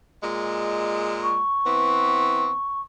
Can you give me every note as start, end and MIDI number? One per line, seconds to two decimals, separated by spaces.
0.23 1.41 46
0.23 1.41 56
1.23 2.81 85
1.66 2.51 52
1.66 2.51 59
1.66 2.51 60